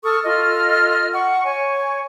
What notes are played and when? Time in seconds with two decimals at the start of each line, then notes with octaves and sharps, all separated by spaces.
0.03 A4 C#6 D#6 F6
0.25 F4 A4 D#5 F6
1.14 F#5 C#6
1.45 C#5 G#5 C#6